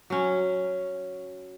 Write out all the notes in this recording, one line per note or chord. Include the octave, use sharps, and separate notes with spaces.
F#3 C#4